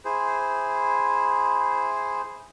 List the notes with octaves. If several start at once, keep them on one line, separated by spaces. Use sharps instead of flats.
E4 G#4 C5